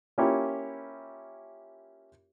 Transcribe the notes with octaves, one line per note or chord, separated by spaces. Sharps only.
A#3 C#4 E4 F4 G4 C#5